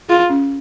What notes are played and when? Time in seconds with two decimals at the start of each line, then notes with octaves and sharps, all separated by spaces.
0.08 F4 G#4
0.30 C#4